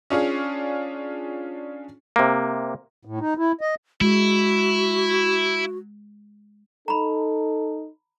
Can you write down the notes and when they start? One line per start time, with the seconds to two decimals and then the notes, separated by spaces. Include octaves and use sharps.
0.10 C#4 D4 F4 G#4
2.16 C3 A#3
3.05 A2
3.20 D#4
3.37 E4
3.61 D#5
4.01 G#3 E4 F#4
6.88 D#4 A4 A#5 B5